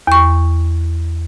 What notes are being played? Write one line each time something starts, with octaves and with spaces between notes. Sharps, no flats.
E2 C#6